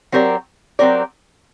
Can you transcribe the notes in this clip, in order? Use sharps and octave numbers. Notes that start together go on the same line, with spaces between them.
F#3 C4 G4 A#4 D5
F#3 C4 G4 A#4 D5